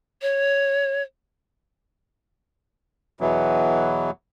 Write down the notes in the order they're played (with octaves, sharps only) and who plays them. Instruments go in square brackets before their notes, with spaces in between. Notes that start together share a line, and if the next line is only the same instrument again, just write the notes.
[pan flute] C#5
[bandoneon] E2 B2 E3 F#3